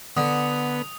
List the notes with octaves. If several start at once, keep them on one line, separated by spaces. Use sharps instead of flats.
D3 B3 D#6